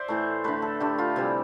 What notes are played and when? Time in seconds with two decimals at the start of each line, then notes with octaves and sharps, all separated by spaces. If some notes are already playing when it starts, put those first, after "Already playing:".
Already playing: C5 D5 E5
0.08 A2 E3 A3
0.44 D3 A3 B4
0.62 A4
0.80 D3 A3 G4
0.98 F4
1.16 C3 E3 G3 E4